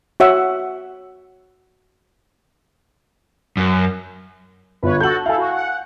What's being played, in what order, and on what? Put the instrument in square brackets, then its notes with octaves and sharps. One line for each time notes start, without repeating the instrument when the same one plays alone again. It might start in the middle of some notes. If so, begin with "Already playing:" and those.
[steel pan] F#4 C#5 E5 F#5
[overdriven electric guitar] F#2
[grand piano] G1 F4 [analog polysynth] B4 C#5
[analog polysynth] F#4 A4 [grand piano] G6 F#7
[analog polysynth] E4 A4 [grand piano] F5 G#5
[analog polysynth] F#4
F#5